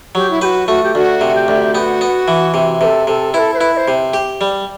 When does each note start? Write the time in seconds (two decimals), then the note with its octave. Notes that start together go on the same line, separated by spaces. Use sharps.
0.15 F#3 G4
0.30 E4
0.41 G4 B4
0.45 F#4
0.68 A3 F#4
0.83 G4
0.95 D2 F#4
1.21 C3
1.35 G4
1.48 D2
1.74 B3 F#4 G4
2.01 B3
2.28 E3
2.54 C3
2.81 C3 A4 B4
3.07 C3 A4
3.34 E4 B4
3.39 A4
3.54 C5
3.57 E4 B4
3.74 E5
3.77 C5
3.88 C3
4.14 G4
4.41 G3